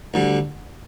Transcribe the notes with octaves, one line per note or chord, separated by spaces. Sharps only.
D2 D3 G3